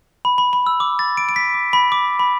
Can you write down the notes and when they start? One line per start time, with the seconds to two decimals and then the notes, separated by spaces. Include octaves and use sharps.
0.25 B5
0.38 B5
0.53 B5
0.67 E6
0.80 D6
0.99 A6
1.17 D7
1.29 D7
1.36 B6
1.54 D6
1.73 B5
1.92 D6
2.19 B5